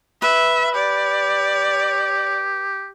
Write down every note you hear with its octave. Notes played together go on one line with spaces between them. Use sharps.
B4 E5
G4 D5